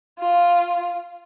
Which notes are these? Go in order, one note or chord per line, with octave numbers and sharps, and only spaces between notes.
F4